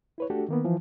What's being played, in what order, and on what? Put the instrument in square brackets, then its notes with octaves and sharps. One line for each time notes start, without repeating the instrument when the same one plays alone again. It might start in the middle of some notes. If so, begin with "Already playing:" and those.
[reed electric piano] E4 B4 C#5
A3 D4 F#4 G4 A4
D#3 A#3 B3
E3 F3